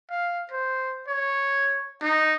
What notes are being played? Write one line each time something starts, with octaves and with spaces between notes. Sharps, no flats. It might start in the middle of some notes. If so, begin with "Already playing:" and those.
F5
C5
C#5
D#4